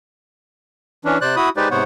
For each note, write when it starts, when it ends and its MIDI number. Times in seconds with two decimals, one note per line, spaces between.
1.05 1.18 52
1.05 1.18 61
1.05 1.18 62
1.21 1.35 48
1.21 1.35 72
1.21 1.35 74
1.21 1.35 90
1.36 1.49 64
1.36 1.49 66
1.36 1.49 83
1.36 1.49 87
1.57 1.68 56
1.57 1.68 63
1.57 1.68 67
1.57 1.68 71
1.57 1.68 72
1.57 1.68 74
1.71 1.84 44
1.71 1.84 48
1.71 1.84 59
1.71 1.84 72
1.71 1.84 73
1.71 1.84 78